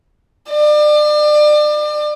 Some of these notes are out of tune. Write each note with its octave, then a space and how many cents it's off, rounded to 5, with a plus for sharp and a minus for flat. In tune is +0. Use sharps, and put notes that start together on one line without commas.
D5 +35